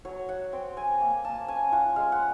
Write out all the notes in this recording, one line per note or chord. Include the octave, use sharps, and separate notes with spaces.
F#3 C#5
F#3 F#5
C4 G5
C4 G#5
A#3
A#3 A5
C#4 G#5
F4 F#5
G#3 F5
F#5